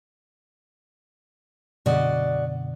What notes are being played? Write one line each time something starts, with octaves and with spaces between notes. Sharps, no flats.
F#2 B2 D3 F#4 D5 D#5